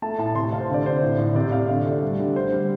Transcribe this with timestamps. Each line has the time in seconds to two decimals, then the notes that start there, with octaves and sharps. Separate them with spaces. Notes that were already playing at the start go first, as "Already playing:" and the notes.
0.02 A3 A5
0.18 A2 A5
0.35 C3 C6
0.44 A5
0.52 C3 F5
0.60 C5
0.69 D3
0.74 D5
0.85 D3 C5
1.02 A2
1.19 A2
1.35 C3 D5
1.52 C3 F5
1.68 D3 D5
1.86 A3
2.02 G3
2.20 D3
2.35 D3 C5
2.53 G3